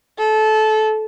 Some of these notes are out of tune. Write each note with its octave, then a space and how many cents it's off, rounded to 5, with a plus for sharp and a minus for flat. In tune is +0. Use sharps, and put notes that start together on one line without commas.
A4 -20